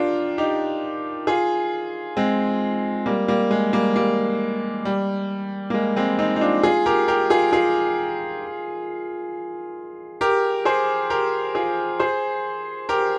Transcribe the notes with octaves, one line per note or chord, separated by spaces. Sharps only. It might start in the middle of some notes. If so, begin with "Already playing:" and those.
Already playing: D4 F4 G4 A#4
D#4 G4
F4 G#4
G#3 C4
G3 A#3
G3 A#3
G#3
G3 A#3
G3 A#3
G3
A#3
G#3
G#3 C4
C4 D#4
D#4
D4 F4
F4 G#4
G4 A#4
G4 A#4
F4 G#4
F4 G#4
G4 A#4
G#4 C5
G4 A#4
F4 G#4
G#4 C5
G4 A#4